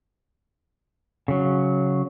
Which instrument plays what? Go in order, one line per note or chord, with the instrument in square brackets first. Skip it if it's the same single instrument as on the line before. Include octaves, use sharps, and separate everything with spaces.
[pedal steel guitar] C#3 F#3